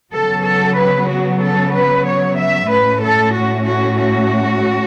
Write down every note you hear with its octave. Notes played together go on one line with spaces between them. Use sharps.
C#3 F#3 B3 A4
A4
B4
F#4
A4
B4
C#5
E5
A2 A3 C#4 B4
A4
F#4
F#4
F#4